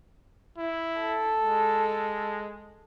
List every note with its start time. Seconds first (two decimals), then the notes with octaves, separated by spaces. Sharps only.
0.58 E4
1.00 A4
1.40 G#3